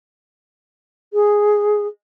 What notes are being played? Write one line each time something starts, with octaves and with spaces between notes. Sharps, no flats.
G#4